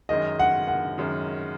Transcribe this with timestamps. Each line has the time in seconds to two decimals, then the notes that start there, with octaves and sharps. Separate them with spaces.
0.09 F#2 D#3 G#3 D#5
0.39 F#5
0.68 F#5
0.98 F#2 D#3 G#3